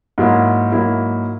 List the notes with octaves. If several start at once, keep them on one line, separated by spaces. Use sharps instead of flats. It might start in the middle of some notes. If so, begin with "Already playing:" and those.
G#2 F#3 A#3 E4
G#2 F#3 A#3 E4